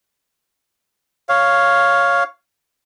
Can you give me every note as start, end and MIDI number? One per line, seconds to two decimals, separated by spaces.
1.29 2.24 73
1.29 2.24 77